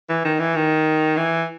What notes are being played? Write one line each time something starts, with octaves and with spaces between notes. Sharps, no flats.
E3
D#3
E3
D#3
E3